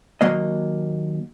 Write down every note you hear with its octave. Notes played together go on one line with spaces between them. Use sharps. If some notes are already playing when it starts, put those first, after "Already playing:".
D#2 F#3 A#3 D#5